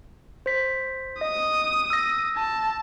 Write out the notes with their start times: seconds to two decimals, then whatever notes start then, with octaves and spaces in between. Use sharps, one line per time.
0.46 C5 B6
1.21 D#5 D#6
1.90 E6 A#6
2.36 A5